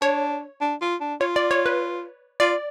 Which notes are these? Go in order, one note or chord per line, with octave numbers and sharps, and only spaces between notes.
D4 C#5
D4
F4
D4
F4 C#5
D5
C#5
B4
F4 D5